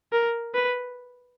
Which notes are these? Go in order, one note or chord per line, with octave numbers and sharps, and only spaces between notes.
A#4
B4